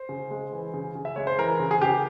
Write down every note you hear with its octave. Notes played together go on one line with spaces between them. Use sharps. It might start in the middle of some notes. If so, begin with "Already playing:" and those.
Already playing: C5
C#3
G#3
E3
C#3
C#3
E5
G#3 C#5
C5
E3 A#4
C#3
G#4
C#3 G4